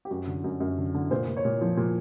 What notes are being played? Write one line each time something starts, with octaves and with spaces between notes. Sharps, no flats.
G4
F#2 F#4
D3
F#2
F#2
D3
D3
A#2 C5
A#2
C#5
A#2
F3
A#2